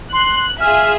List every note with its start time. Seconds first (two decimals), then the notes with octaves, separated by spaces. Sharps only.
0.13 C6 F#6
0.60 F4 G#4 E5 F6